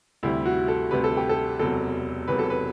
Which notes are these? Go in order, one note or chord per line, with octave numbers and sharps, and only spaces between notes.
D2 C3 G3 E4
F#4
A4
D2 C3 G3 B4
A4
G4
A4
E1 E2 C3 F#3 A4
E1 E2 C3 F#3 B4
A4
B4